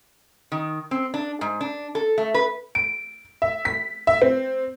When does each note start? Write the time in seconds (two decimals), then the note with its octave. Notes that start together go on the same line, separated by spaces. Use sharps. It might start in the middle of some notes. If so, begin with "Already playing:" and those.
0.52 D#3
0.91 C4
1.14 D4
1.41 G#2
1.61 D4
1.95 A4
2.18 A3
2.34 B4
2.75 D7
3.42 E5
3.65 B6
4.07 E5
4.22 C4